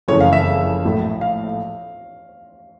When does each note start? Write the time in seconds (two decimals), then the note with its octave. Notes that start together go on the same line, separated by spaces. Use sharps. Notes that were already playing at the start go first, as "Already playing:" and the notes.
0.08 F#1 F2 C#3 E3 A3 C#5
0.21 F5
0.33 E5
0.84 A#1 A2 F#3 A3
1.21 F5